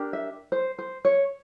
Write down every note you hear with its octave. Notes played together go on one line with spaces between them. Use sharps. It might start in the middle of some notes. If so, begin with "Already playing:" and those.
Already playing: D4 G4 A#4
E5
C5
C5
C#5